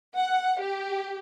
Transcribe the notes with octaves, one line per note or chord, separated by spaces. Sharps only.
F#5
G4